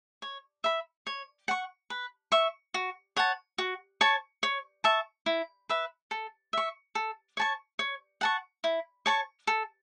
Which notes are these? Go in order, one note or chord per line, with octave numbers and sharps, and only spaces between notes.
C#5
E5 B5
C#5
F#5 C#6
B4
E5 C#6
F#4
C#5 F#5 A5
F#4
C#5 A5 C#6
C#5
E5 A5 C#6
E4
B4 E5 B5
A4
E5 C#6
A4
C#5 A5 C#6
C#5
F#5 A5 C#6
E4
C#5 A5 C#6
A4